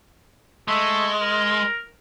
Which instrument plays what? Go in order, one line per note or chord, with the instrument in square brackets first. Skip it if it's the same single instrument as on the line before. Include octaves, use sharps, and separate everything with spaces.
[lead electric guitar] G#3 [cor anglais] A3
[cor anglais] A#4